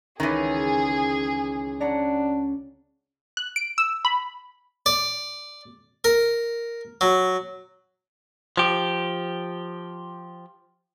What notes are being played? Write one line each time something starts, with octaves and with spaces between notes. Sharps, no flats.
C#2 D#3 E3 G#4 A6 D#7
C#4 D4 F#5 A#5
F#6
D7
E6
B5
D5
A#4
F#3
F3 G4